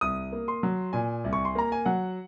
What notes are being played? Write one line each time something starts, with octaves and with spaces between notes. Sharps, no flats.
C2 D#6
A#3
C6
F#3
A#2 G#5
C2
C#6
C6
A#3 A#5
G#5
F#3 F#5